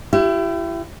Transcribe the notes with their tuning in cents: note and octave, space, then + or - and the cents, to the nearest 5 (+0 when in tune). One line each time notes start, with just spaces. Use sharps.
E4 +30 G4 -25